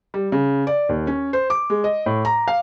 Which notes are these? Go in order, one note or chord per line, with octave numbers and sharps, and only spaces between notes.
G3
C#3
D5
D#2
C#4
C5
D6
G#3
D#5
A2
A#5
F5